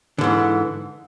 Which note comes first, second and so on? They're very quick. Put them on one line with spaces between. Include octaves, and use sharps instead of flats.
D3 G#2 E3